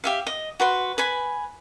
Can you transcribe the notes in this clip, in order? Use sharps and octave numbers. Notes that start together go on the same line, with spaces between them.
G4 E5 F5
D#5
F#4 B4 C6
B4 G#5 B5